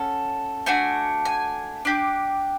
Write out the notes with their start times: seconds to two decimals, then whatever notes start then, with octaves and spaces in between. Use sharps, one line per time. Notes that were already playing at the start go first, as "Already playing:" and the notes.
Already playing: C#4 F#4 A4
0.66 A3 D4 F#4 G#5
1.25 G#5
1.85 D4 G4